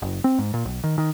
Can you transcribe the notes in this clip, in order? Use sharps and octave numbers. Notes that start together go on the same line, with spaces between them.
F#1
C4
G#2
A#2
B1
D#3
D#3